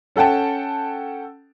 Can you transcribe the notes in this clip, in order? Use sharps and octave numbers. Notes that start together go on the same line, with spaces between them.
C#4 A4 F#5 G5 A5